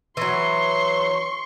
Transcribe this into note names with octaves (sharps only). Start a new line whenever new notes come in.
E3 F#3 C6 C#6